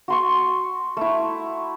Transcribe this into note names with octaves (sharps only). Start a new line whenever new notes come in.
F#4 C6 C#6
A3 E4